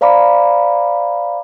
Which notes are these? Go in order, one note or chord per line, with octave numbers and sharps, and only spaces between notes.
C5 D5 F5 A#5 B5 D6